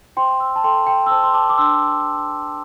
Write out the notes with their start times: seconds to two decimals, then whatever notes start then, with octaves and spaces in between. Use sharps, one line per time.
0.17 C5 G5 C6
0.40 C6 E6
0.56 A5
0.64 A4 G5 C6
0.87 G5 C6
1.06 E6
1.10 C5 A5 D6
1.23 C6
1.34 A5 D6
1.49 D6
1.58 D4 C6 E6